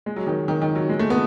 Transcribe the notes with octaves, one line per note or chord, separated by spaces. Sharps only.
G#3
F#3
D#3
D#3
D#3
F#3
G#3
A3
B3